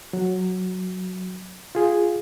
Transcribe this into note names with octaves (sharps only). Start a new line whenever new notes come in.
F#3
F4 G#4